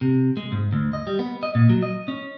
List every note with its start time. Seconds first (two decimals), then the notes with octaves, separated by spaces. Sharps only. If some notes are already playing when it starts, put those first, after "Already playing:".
0.01 C3
0.37 G#3
0.52 G#2
0.73 D2
0.93 D#5
1.07 G3
1.19 B3
1.43 D#5
1.55 A#2
1.69 F#3
1.83 D#5
2.08 C#4